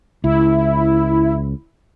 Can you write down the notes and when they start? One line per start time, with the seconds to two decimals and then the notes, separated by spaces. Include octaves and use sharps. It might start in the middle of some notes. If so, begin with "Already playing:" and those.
0.24 C#2 E4